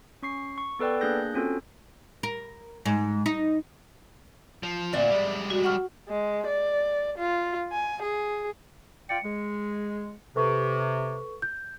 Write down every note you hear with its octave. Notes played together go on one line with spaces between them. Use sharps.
C#4 C#6 C7
C#6
B3 A4 B4 D5 G5
A#3 D4 G#4 F#6 G6 A#6
C4 C#4 F4 F#4 A4
A#4
G#2
D#4
F3
D2 A#2 C4 D5 E5
G3 G#3
F#4
F#5 C#6 F6
G#3
D5
F4
G#5
G#4
F4 D5 G5 C#7
G#3
C3 A4 B4 C#6
G6